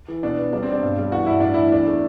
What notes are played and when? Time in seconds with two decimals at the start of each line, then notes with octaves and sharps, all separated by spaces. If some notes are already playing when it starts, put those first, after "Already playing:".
0.08 E3
0.23 B2 D4
0.38 B3
0.52 G3 D4
0.63 C4
0.68 B2 D4
0.82 G2
0.98 G3
1.12 E3 F#4
1.26 G2 E4
1.40 A2 D4
1.54 E3 E4
1.72 E2 D4
1.87 A3